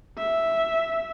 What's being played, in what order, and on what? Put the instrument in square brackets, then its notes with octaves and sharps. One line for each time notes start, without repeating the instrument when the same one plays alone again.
[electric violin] E5